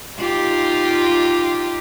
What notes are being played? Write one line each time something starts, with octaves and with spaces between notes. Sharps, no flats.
D#4 F4 G4